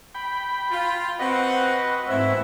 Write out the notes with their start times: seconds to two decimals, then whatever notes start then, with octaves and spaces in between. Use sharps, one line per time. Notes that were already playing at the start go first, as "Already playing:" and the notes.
0.15 G5 B5
0.71 F4
1.19 C4 F#4 B4 D#5 F#5
2.08 G#2 E3 A3 C4 E4 E5